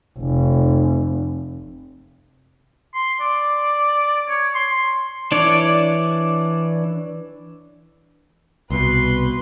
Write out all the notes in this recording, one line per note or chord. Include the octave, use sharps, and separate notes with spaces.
F1
C6
D5
C#5
C6
E3 D4 C#5 D5
C2 B2 B4 C6